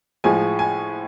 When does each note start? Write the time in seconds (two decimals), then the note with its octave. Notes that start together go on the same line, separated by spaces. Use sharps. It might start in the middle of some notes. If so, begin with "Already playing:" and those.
0.24 A2 F3 G#3 G#5
0.59 G#5